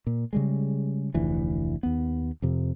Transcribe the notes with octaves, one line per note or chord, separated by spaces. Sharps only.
A#2
C#3 G3 G#3
F1 D2 E3
D#2 B3
F2 C3